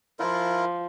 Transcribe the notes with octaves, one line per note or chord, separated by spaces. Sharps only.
F3 E4 F4 A#4